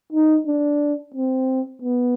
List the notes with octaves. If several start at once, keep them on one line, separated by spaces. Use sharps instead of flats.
D#4
D4
C4
B3